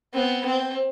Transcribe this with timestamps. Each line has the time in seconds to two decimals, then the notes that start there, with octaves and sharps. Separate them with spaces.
0.14 B3 C4
0.46 C4